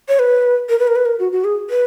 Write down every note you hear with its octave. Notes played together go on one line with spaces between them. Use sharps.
C#5
B4
A#4
B4
A#4
B4
A#4
F#4
F#4
G#4
B4